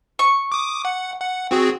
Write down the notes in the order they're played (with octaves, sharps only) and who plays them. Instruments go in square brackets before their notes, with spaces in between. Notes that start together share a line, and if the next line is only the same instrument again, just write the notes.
[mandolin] C#6
[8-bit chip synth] D6 D#6
F#5
F#5
C4 F#4 G#4